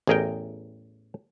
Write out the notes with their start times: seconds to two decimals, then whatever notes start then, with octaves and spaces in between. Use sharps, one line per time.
0.07 A1 E2 G#4 A#4 D#5 G5